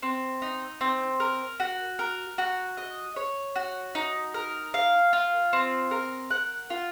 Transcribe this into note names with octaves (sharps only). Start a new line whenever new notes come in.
C4
D#4
C4
A#4
F#4
A#4
F#4
D#5
C#5
F#4
D#4
A#4
F5
F4
C4
A#4
F#5
F4